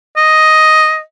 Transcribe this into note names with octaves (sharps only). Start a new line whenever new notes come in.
D#5